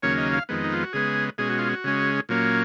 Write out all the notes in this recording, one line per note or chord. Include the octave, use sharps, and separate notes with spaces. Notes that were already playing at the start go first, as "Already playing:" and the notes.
D#2 C#3 F#3 A#3 C#4 C#5
D#5
F5
F2 D#3 G#3 B3
D#4
F4
F#4
C#3 G#3 B3 G#4
B2 G#3 C#4 G#4
F#4
F4
F#4
C#3 G#3 C#4
A#2 F#3 A#3 C#4